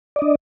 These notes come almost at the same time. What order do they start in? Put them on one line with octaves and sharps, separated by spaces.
D5 D#5 D4